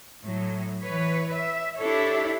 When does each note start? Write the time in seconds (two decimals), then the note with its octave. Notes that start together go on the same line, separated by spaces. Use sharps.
0.24 A2 F#3
0.84 E3 B4 C#5
1.33 E5
1.78 D4 E4 G4 A4 C#5